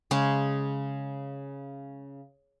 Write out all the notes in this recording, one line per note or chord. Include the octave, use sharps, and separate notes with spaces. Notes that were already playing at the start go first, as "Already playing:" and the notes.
C#3 G#3 C#4